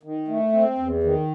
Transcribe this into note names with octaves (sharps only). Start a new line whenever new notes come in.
D#3
A3
C4
E2
D#3